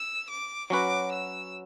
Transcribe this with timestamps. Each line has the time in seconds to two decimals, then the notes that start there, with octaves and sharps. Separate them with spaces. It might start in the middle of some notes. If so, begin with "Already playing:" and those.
Already playing: E6
0.30 D6
0.70 F#3 C#4 F#4 B4 D6
1.11 E6